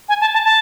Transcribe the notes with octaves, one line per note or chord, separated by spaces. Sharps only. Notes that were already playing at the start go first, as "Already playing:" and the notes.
G#5
A5
A5
A5